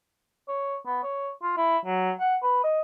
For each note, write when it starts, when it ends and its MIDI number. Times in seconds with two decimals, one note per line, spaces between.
0.48 0.77 73
0.86 0.99 59
1.03 1.30 73
1.43 1.56 65
1.57 1.78 64
1.85 2.11 54
2.20 2.36 78
2.43 2.64 71
2.64 2.81 75